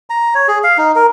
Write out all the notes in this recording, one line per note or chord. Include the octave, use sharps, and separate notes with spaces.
A#5
C#5
G#4
F5
D#4
A#4